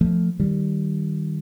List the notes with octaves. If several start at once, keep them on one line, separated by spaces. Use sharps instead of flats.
F3 A3
D#3 G3